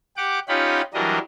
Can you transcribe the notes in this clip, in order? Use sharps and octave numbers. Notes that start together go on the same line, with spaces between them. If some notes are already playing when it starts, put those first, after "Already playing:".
G4 F#5 D6
C#4 D#4 F4 G4 F#5 B5
E3 F#3 G3 D4 A#4 D#5